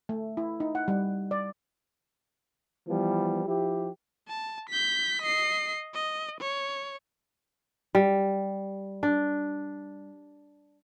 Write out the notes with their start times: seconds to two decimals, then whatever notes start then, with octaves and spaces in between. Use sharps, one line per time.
0.09 A3
0.37 E4
0.60 D#4
0.75 F#5
0.88 G3
1.31 D5
2.87 E3 F3 G3 B3
3.46 F3 E4 G4
4.28 A5
4.69 G6 B6
5.22 D#5 C7
5.94 D#5
6.41 C#5
7.95 G3
9.03 D4